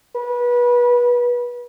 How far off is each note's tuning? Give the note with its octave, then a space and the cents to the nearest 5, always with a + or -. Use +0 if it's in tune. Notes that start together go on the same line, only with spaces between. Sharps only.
B4 -25